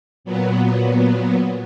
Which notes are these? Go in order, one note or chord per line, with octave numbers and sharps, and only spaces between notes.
A#2 F#3 B3